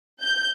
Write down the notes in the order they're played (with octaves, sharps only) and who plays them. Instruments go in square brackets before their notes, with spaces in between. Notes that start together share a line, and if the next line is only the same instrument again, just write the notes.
[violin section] G6